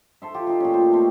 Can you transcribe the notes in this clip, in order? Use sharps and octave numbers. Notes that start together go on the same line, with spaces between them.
A4 C5 E5
F4 G4
D#4 G4
A#2 C#4
C5
A3 C4 A4